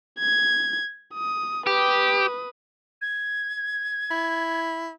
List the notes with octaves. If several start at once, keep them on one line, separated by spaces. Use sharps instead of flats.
G#6
D#6
G4 B4 D#6
G#6
E4